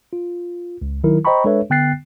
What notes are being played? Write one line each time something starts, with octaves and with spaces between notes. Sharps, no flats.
F4
C#2
D#3 F#3 E4 A#4
C5 D#5 G5 A#5 B5 C#6
G#3 D4 A4 B4 C#5 E5
D3 B3 G5 F#6 A6 C7